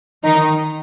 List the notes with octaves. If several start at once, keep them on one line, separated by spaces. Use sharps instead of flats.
D#3 D#4